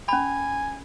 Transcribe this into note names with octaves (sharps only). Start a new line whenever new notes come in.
C#4 G#5 B5